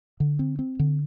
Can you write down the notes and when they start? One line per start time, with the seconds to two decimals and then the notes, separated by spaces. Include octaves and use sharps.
0.20 D3
0.39 C4
0.59 C4
0.79 D3